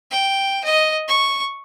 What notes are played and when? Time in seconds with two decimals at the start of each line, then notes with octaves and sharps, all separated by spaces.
0.11 G5
0.64 D#5
1.08 C#6